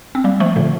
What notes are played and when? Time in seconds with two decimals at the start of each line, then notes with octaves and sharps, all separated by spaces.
0.15 C4
0.24 G3 A#3
0.40 F3 A3
0.56 A#2 D3